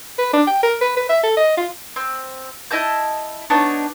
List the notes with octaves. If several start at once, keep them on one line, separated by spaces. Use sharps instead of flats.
B4
D4
G5
A#4
B4
B4
E5
A4
D#5
F4
C4
E4 D#5 A5 G6
B3 D4 D#4 C#5